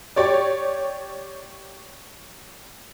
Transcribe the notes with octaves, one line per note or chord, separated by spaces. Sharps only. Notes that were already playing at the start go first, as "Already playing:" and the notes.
G4 C#5 D5